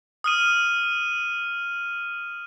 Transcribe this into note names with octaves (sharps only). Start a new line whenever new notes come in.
D#6 F6 D#7